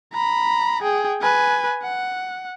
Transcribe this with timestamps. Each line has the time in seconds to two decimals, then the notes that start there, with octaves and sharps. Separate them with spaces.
0.13 A#5 B5
0.82 G#4 G5
1.21 B4 G#5
1.83 F#5